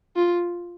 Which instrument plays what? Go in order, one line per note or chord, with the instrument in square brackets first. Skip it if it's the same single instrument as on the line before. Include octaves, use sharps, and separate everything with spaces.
[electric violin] F4